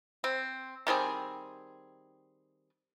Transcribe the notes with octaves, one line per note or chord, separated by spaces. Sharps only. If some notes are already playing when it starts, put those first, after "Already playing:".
C4
D#3 G3 C4 G#4